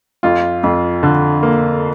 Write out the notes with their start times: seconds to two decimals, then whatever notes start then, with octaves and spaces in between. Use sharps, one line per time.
0.23 F2 F4
0.63 F2
1.03 D3
1.43 A#3